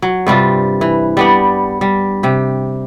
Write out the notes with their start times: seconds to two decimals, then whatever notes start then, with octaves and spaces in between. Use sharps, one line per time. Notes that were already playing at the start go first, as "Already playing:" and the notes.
0.02 F#3
0.27 G2 C3 G3 F4
0.81 E3
1.17 G3 B3 D4
1.81 G3
2.23 C3 G4